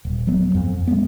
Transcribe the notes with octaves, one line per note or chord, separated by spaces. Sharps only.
D#1
F#3 B3
D#1 F2
G#3 B3